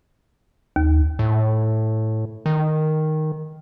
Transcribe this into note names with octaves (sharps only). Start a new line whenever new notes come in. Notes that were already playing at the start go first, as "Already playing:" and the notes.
D#2
A2
D#3